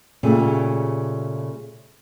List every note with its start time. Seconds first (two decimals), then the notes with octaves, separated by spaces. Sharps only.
0.23 A#2 C#3 G3 A3 G#4